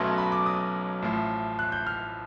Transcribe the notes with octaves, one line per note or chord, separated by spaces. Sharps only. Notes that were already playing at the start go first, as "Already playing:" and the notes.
Already playing: B1 B2 F#3 A3 C#4 C6
B5
D6
D#6
A1 A2 F3
F#6
G6
F6